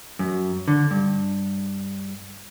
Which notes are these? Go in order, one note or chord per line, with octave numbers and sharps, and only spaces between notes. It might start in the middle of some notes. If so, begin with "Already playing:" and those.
F#2
D3
G2